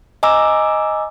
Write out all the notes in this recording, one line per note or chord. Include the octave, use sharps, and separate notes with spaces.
D#5 G#5 A#5 D6 E6